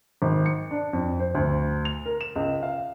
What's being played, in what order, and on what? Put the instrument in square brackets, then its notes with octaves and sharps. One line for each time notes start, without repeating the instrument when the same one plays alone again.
[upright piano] G#1
C#7
D4
F2
C5
D2
F7
A#4
E7
C#2
F5